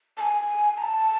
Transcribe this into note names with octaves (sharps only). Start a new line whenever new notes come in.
A5
G#5
A#5
A5